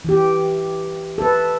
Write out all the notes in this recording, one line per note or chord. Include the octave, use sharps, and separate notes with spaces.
E3 G4
A4 B4